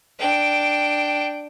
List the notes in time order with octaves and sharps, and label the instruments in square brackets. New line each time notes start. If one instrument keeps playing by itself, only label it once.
[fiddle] D4 G5